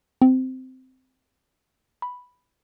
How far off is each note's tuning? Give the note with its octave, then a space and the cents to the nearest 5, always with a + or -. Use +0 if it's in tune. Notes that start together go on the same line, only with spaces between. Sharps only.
C4 -15
B5 +0